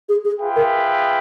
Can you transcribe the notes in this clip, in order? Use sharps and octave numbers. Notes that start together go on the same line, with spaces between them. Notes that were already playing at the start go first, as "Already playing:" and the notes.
G#4
G#4
F4 G#4 B4 E5 G5
A#4